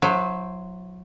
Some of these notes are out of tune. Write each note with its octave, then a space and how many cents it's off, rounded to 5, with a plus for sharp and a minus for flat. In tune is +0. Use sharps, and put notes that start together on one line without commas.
F#3 -20 E4 +15 C5 +0